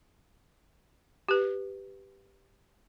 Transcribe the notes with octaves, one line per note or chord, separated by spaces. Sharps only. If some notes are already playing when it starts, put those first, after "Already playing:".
G4 B4